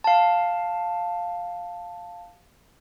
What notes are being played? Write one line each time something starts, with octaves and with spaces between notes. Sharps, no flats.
F5 A5